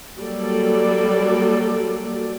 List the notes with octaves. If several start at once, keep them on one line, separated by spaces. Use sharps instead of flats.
F#3 G3 A#3 A4 D5